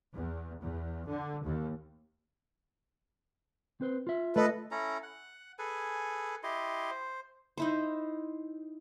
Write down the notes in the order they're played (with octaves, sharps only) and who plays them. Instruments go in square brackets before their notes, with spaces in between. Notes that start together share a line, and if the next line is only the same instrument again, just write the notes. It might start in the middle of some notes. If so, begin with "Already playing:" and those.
[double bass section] E2
E2
D3
D#2
[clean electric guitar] C4 B4 C5
F4 E5
[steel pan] A3 D#5 [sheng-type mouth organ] A4 B4
[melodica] C#4 E4 A4 A#5
F#5
G#4 A4 B4 G#5
E4 G4 D#5 C6
C5
[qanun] D#4 E4 C5